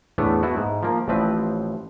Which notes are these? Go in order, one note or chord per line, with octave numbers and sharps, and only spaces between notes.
E2 A2 A3 B3 D4
A3 B3 E4 F#4
G#2
F3 A#3
A1 A2 F3 C4 B4